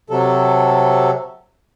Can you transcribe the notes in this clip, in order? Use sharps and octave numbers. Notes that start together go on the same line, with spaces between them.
C3 F#3 A4